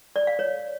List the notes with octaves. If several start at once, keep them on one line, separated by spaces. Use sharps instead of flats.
D5
F5
C#5